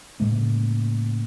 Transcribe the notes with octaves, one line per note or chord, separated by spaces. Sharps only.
A2 C#3 G#3 A#3